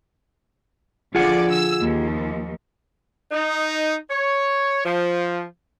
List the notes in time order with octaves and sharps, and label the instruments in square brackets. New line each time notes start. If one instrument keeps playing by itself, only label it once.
[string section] D3 F3 D5 [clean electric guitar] F4 G#4 F#5
[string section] E6
D#2 F3
[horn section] D#4
C#5
F3